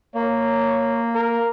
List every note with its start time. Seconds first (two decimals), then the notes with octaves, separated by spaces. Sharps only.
0.15 A#3 C#5
1.15 A#4